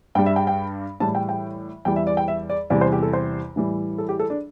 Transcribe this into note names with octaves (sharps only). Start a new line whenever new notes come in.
G2 G3 G5
E5
G5
G5
A2 E3 G3 A5
G5
G5
E2 E3 G3 G5
E5
D5
G5
E5
D5
E2 C3 G3 D5
C5
G4
A4
C5
A2 E3 G3
A4
G4
A4
D4